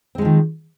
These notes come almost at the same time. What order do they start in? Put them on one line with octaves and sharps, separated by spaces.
C4 G#3 F3 D#3